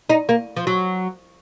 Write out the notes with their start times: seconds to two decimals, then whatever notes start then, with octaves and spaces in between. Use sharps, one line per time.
0.09 D#4
0.29 A#3
0.57 F3
0.67 F#3